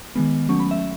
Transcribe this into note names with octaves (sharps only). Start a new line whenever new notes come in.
D#3 G#3 B3
F#3 A3 C#4 C#6
B5
E5